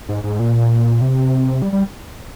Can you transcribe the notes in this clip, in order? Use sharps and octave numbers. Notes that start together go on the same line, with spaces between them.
G#2
G#2
A#2
C3
G3
G3